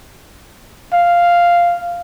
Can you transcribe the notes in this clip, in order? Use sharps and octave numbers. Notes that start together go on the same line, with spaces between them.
F5